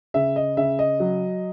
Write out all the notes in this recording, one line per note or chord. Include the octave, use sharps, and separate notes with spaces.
C#3 E5
D#5
C#3 E5
D#5
F#3